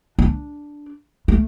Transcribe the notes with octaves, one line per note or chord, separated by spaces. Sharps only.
D4
A3